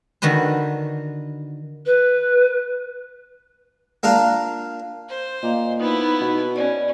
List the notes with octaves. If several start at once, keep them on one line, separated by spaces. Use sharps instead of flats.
D3 D#3 F#4 B4 C5
B4
A#3 D4 F4
C5
A#2 D#5 F5
B3 D#4 E4
B2
C#4 D5